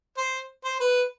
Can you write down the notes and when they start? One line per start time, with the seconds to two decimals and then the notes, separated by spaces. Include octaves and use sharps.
0.17 C5
0.64 C5
0.80 B4